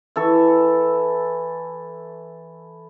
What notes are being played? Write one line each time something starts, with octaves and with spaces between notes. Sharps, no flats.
E3 A4 C#6